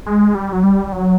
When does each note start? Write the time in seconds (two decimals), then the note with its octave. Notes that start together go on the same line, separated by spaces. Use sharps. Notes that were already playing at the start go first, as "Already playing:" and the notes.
0.06 G#3
0.35 G3
0.53 F#3
0.64 G3
0.92 F#3